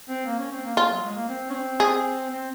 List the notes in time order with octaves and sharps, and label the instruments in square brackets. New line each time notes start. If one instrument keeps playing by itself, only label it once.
[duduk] C4
A#3
C#4
C4
A#3
[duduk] A#3 [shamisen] F4
[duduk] F#3
G#3
A#3
C4
C#4
C4
[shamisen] G#4
[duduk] C4